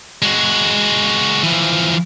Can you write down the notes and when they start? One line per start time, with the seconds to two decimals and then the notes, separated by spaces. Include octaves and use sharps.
0.22 G#3 F#4
1.44 E3 F3